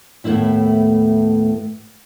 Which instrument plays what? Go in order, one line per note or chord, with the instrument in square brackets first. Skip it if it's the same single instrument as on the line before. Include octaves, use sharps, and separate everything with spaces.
[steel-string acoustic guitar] D#2 A2 A3 B3 E4 E5